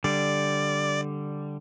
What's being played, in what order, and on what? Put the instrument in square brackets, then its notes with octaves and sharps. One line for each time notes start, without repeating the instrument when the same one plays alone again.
[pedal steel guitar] D3 G3 [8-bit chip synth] D5